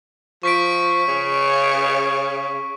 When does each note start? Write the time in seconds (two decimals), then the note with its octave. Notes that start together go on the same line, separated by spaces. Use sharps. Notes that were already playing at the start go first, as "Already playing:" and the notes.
0.43 F3 C#6 B6 D7
1.08 C#3